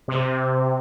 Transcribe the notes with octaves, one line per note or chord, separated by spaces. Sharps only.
C3